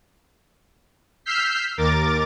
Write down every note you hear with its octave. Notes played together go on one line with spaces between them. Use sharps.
E6 F6 G6 B6 C7
D#2 A#4 D6 A6